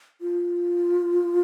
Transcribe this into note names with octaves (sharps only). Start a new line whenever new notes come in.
F4